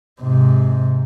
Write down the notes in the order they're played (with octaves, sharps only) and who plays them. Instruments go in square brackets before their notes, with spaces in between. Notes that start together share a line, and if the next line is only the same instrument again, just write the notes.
[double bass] G#2 C3